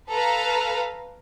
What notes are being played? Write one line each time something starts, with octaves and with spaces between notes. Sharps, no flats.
A4 B4 F5 A#5